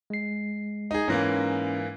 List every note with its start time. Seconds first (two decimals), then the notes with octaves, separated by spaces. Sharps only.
0.10 G#3 C7
0.91 D#4 G#4
1.08 G#2 E3 A#3 C#4 A#6